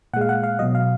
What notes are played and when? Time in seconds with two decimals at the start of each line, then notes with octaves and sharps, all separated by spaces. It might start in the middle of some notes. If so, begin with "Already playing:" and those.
0.13 A#2 F#5
0.16 G#3 F5
0.29 F#5
0.44 F5
0.59 B2 F#3 D#5
0.75 F5